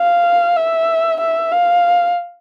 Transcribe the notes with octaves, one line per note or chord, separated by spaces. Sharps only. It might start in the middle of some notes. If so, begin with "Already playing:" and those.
Already playing: F5
E5
E5
F5